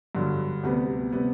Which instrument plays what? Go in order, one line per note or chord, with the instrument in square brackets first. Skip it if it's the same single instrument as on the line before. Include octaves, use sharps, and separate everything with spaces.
[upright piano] G2 D3 F#3
D2 C3 G3 B3
C3 G3 B3